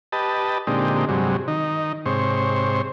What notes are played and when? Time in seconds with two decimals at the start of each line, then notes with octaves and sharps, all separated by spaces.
0.12 G4 B4 D#5 A5
0.67 A#2 D3 G#3 C4 D#4 G4
1.09 G2 C3 F#3 G#3
1.48 D#3 D#4
2.06 G#2 C3 C5 C#5